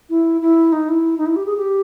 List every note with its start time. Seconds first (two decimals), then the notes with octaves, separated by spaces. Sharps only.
0.09 E4
0.41 E4
0.72 D#4
0.88 E4
1.17 D#4
1.25 E4
1.36 G4
1.46 G#4
1.56 G4